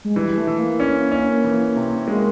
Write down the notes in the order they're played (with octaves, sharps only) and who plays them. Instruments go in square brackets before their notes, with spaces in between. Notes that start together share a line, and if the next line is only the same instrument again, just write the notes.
[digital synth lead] G#3
[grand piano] E3 [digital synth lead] G3
[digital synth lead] A3
[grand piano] E3
[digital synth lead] A#3
[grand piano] C#4
C#4
E3
C3
[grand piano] G#3 [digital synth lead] A#3